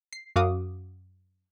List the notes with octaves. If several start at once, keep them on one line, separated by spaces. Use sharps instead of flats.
C7
F#2 F#4 F5 D6 D#6